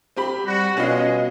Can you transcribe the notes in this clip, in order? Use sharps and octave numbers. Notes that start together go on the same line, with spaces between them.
C4 G4 B5
G3 F#4
B2 G#3 C#4 F4 D#5